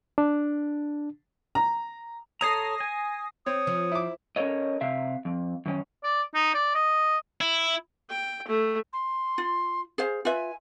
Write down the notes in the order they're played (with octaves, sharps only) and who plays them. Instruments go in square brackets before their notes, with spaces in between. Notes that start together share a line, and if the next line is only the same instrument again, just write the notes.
[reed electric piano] D4
[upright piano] A#5
[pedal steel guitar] A4 C#5 A#5 [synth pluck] D#6 A#6 C7
[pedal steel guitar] G#5
[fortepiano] C4 [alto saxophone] C#5 [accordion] D#6
[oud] F3
[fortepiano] E4 D6
[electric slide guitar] C#4 A4 A#4 C#5 D#5
C3 E5 F5
F2
F#2 D#3 C#4
[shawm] D5
D#4
D5
D#5
[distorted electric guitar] E4
[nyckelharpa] G5
A3
[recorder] C6
[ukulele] F4
G#4 C5 F5
[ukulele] F4 B4 E5 [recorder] G#5